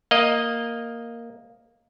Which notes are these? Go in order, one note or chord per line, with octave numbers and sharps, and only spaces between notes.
A#3 D#5